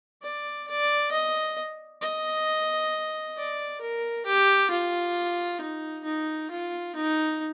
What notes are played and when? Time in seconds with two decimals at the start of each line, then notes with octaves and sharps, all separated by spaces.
0.22 D5
0.68 D5
1.12 D#5
2.01 D#5
3.37 D5
3.81 A#4
4.26 G4
4.71 F4
5.61 D#4
6.05 D#4
6.51 F4
6.96 D#4